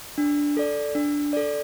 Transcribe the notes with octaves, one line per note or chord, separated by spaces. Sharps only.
D4
A4 D5
D4
A4 D5